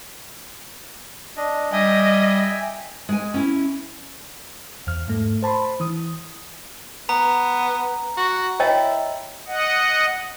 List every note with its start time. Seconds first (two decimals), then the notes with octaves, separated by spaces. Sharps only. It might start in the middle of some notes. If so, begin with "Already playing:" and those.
1.37 D4 D#5
1.73 G3 D#5 E5 G5 G#5
3.09 G#3 G#5
3.34 C#4 E4
4.87 E2 F6
5.08 G#2 A3
5.43 C5 A5 B5 C6
5.80 E3 D#6
7.09 B3 A#5
8.17 F#4
8.60 E4 C#5 D#5 G5
9.47 D#5 F#5